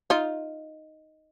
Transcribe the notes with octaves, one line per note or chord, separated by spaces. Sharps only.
D#4 F4